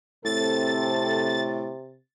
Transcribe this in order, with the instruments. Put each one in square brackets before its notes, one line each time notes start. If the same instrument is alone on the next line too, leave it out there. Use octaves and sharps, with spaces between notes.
[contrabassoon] A2 [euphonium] C3 [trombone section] C4 A4 [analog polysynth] A6